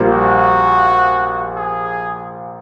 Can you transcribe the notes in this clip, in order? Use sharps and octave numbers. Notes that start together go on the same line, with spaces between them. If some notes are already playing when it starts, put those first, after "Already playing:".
Already playing: A#1 A#2 G3 A#3
F#4
G#4